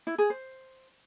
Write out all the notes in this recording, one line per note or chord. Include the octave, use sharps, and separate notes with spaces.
E4
G#4
C5